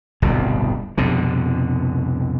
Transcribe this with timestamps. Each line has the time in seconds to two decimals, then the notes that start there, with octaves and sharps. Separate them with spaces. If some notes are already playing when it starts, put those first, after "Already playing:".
0.22 D1 G1 C2 B2
0.98 C2 F2 B2 D3